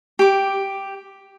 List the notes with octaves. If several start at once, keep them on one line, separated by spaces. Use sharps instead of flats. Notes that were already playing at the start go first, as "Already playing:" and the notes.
G4 D6